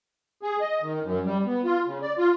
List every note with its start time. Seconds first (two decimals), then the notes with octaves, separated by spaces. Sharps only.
0.43 G#4
0.61 D#5
0.82 D#3
1.03 F#2
1.25 G3
1.46 B3
1.65 F4
1.86 C#3
2.02 D5
2.18 F4